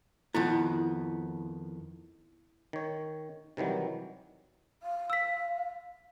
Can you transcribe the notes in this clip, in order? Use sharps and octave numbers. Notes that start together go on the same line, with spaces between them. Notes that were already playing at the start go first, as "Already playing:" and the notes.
F2 D#3 B3 E4
D#3 C#5
C3 D#3 E3 F#3 G3
F5
E6 B6